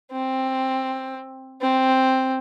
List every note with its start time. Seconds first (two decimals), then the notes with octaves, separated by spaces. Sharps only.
0.11 C4
1.61 C4